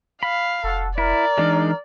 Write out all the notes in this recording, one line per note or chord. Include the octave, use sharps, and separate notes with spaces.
F5 B5
F1 F#4 A4
E4 A#4 D5
E3 G#3 D4 D#4